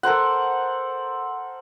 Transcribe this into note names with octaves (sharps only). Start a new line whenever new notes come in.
A4 A#4 C5 F#5